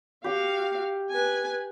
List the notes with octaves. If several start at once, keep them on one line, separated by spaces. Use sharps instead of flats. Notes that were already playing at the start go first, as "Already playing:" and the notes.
F#4 G4 F5 G5
B4 G#5